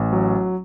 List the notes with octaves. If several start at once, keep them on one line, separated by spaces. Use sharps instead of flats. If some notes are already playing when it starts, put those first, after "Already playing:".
Already playing: A1
F#3